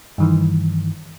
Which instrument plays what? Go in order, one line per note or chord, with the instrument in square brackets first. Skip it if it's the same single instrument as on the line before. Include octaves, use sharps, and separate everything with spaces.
[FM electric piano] G2 D#3 E3